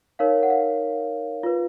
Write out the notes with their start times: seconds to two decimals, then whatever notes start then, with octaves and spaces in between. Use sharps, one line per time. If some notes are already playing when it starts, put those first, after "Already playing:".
0.19 D#4 A#4 C#5 F5
0.43 F#5
0.50 F5
1.43 F4 B4